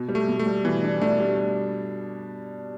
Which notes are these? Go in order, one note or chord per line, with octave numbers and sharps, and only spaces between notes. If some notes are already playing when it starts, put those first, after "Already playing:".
Already playing: B2
G3
A3
B2
A3
G3
B2 E3
D4
A3 D4
G3